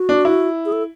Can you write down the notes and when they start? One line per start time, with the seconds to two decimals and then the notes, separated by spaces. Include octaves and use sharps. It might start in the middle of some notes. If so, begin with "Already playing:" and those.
Already playing: F#4
0.09 D4
0.25 E4
0.66 G#4
0.72 A4